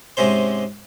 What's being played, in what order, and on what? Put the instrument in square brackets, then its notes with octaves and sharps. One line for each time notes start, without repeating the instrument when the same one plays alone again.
[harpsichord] G#2 C3 G#3 C#4 C5